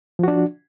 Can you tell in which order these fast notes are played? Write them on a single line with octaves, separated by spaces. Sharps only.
F3 F#4 D4